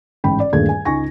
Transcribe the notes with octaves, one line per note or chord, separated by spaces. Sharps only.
A1 G#2 G5 B5
D5
D#1 G2 A#2 A3 G#4 G#6
G#5
C#2 D#4 G#5 C#6 A#6